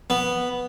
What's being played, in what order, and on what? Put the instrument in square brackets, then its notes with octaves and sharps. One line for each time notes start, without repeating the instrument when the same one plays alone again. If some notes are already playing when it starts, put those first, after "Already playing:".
[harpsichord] B3